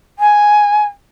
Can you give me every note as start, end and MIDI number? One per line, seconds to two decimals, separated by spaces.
0.19 0.83 80